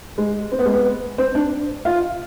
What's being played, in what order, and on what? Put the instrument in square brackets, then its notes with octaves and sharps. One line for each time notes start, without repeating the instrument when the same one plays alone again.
[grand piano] G#3
C4
B3
G#3
B3
C4
D4
F4